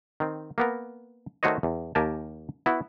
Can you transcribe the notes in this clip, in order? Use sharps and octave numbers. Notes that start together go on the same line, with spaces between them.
D#3 C4
A#3 B3 A#4
D#3 A3 F#4 C5 C#5 D#5
E2
D#2 G4 A#4 G#5 A5
B3 E4 F#4